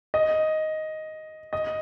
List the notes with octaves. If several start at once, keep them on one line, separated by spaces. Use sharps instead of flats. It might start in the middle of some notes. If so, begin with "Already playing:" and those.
D#5
D#5